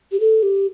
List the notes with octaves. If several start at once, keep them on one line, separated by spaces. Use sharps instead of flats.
G4
A4
G4